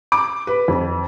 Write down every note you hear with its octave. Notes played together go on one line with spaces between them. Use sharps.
D6
B4
F2